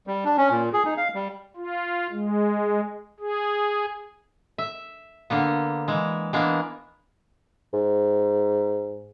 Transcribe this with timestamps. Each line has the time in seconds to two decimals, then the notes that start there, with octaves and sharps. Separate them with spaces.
0.07 G3
0.25 D4
0.38 C#4
0.51 A#2
0.73 G#4
0.85 D#4
0.97 F5
1.15 G3
1.56 F4
2.11 G#3
3.20 G#4
4.58 E5
5.30 D3 A#3 B3
5.88 E3 G#3
6.33 E3 G#3 A#3 B3 D4
7.73 G#2